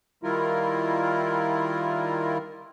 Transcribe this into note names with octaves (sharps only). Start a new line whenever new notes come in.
D#3 G3 E4 F4 A#4